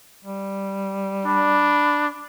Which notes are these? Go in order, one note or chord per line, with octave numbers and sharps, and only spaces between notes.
G3
D4 B5